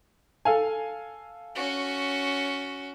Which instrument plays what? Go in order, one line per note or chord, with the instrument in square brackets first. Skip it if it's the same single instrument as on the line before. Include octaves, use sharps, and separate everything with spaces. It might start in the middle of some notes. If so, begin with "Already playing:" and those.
[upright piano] A4 F5 G#5
[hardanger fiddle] C#4 F#4